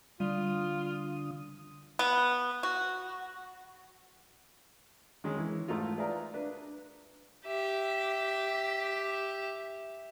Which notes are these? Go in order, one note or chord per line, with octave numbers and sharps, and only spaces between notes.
D3 G3 F4 D#6
B3
F#4
D#3 G#3 C#4
E3
G#2 A3 D#4 F4
G#4 B4 D5 E5 F5 A#5
D4 B4
G4 E5